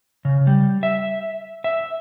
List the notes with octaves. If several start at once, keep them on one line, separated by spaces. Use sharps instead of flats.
C#3
G3
E5
E5